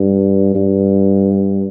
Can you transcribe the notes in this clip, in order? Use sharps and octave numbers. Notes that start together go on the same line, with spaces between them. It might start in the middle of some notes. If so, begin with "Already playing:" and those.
Already playing: G2
G2